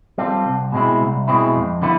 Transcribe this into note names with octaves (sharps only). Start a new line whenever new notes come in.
G3 C4 F4 A4
C2
B2 G#3 C4 E4
C2
B2 G#3 C4 E4
F2
D3 G3 B3 E4